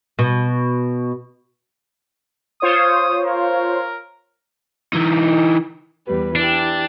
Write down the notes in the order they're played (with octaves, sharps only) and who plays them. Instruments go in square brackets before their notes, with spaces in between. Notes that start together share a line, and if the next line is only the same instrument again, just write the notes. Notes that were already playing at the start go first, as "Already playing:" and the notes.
[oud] B2
[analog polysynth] F4 C5 C#5 [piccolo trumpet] D#6
[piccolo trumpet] A#4
[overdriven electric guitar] E3 D#4
[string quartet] E2 G3 B4
[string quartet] E3 G4 [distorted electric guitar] D4